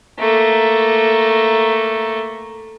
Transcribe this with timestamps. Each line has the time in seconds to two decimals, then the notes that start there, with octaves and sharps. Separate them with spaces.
0.19 A3 A#3